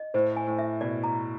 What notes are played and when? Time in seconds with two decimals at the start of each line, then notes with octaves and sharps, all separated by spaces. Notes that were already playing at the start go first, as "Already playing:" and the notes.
Already playing: D#5
0.14 A2 C5
0.37 G#5
0.47 A2
0.58 E5
0.81 B2 D5
1.04 A#5